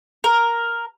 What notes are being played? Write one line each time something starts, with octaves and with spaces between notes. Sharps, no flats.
A#4